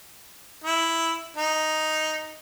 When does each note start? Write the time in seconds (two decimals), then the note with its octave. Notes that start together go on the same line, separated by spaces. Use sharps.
0.64 E4
1.37 D#4